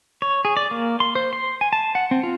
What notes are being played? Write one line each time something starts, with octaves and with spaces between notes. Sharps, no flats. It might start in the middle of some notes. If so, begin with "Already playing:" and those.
C#5
G#4
D5
A#3
C6
C5
C6
G#5
A5
F#5
C4
F4